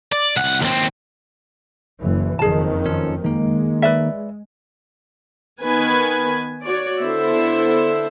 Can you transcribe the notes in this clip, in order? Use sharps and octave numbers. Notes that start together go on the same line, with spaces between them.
D5
C2 F#5
D#2 C4
F#1 E3
F#1 F2 D#3 G#4 A5
F3 C#4 A4
D#3 G#3 A#3
B4 D5 E5
D#3 B3 B4 G#5
F#4 C#5 D5
D3 B3 E4 A4 C5 E5